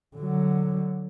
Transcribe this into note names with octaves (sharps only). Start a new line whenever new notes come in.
D3 F#3